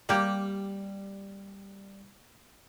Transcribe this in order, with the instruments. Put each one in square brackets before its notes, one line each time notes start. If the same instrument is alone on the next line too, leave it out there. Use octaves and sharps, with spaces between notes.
[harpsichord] G3 [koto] A#3 G4